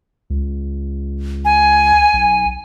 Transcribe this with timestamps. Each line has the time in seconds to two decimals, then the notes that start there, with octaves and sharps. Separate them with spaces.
0.30 C#2
1.45 G#5
2.13 B1